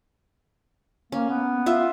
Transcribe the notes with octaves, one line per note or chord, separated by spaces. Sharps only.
A#3 C#4
B3
F4 E5